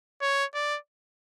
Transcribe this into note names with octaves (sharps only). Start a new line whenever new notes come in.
C#5
D5